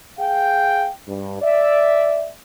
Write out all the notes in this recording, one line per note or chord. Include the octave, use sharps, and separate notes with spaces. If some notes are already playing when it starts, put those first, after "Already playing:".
G#4 F5 G5
G2
D5 E5